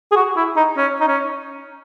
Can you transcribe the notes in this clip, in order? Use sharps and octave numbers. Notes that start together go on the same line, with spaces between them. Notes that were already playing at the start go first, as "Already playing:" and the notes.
G#4
F#4
E4
D#4
C#4
D#4
C#4